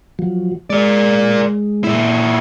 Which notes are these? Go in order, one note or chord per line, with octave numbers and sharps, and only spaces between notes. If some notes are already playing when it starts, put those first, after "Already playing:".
F3 F#3
G#3 A#4 D5
A#2 E4